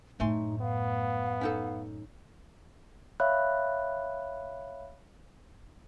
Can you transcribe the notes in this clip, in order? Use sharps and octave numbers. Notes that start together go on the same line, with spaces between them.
F#2 A2 A3 D#4 G#5 C6
B3 F5
C#4 D#4 A4
C#5 E5 F5 B5 F#6